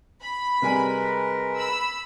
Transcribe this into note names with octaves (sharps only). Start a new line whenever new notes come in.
B5
C3 G3 G#3 A#4 B4 G#5
B5 E6